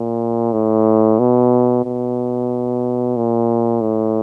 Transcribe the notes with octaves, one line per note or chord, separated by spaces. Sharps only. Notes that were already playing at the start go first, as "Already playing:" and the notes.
Already playing: A#2
A2
B2
B2
A#2
A2